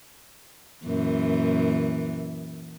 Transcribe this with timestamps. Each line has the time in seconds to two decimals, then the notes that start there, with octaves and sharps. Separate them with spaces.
0.85 F#2 A#2 E3